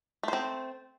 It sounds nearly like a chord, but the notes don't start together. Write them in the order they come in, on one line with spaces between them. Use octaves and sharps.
A3 C5 C4